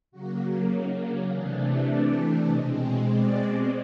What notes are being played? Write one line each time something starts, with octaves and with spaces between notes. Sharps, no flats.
C#3 F#3 A#3 F#4
D#4
D4
C3 E3 A3 D4 G#4
D5
B2 G#3 C4 D#5
C#5
D5